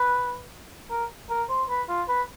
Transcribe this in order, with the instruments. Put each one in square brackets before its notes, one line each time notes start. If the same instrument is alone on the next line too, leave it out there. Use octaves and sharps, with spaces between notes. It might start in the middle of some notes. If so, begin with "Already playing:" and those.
Already playing: [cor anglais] B4
A#4
A#4
C5
B4
F4
B4